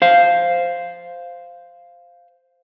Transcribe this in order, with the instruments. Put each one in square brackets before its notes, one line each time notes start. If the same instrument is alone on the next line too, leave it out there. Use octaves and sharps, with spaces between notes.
[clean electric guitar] C5 F5